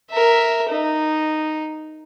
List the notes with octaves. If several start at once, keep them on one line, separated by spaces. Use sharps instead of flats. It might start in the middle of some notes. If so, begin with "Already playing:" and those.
A#4 E5
D#4